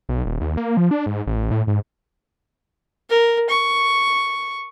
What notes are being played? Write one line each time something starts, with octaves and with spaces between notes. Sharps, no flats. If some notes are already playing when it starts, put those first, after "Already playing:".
B1
D#1
D#2
A#3
F3
D4
G#2
A1
A2
G#2
A#4
C#6